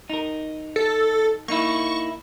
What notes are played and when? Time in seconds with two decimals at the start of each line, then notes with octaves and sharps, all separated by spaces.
0.10 D#4 A#4
0.76 A4
1.48 A#3 D#4 E4 C#6